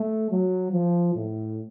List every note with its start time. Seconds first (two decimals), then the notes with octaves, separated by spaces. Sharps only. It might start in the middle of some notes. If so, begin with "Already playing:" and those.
Already playing: A3
0.31 F#3
0.72 F3
1.15 A2